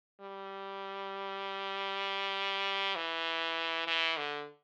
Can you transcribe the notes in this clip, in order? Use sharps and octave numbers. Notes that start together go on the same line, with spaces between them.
G3
E3
E3
D3